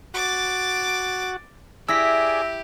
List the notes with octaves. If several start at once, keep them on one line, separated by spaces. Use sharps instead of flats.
F#4 D6 A6
E4 G4 G#4 D5 E6 A#6 B6